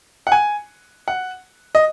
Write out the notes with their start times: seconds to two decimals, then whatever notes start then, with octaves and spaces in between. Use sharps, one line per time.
0.27 F#5
0.32 G#5
1.08 F#5
1.75 D#5